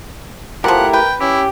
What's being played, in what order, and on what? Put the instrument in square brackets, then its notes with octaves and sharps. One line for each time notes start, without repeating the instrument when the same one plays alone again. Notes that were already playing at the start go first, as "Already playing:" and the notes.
[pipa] B2 F3 [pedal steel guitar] A3 E4 G4 [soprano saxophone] A#4 [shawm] F#5
[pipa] B4 [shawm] G5
[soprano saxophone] C#4 [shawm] E4 [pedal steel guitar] G4